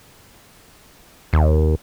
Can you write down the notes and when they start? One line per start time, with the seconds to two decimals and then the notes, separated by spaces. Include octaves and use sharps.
1.33 D#2